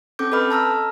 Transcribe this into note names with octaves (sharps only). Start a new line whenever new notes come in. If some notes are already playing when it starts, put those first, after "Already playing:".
C4 C#4 A4 D6 G6
A4 B4 D#5 B5 F6
A5 A#5 E6 F6